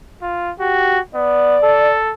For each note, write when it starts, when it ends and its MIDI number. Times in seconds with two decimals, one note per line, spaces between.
0.22 0.51 65
0.60 1.00 66
0.60 0.98 67
1.15 1.57 59
1.15 1.96 74
1.63 2.13 69